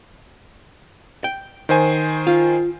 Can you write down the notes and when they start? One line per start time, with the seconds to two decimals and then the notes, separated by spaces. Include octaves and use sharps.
1.24 G5
1.69 D#3 C5 G#5
2.27 F4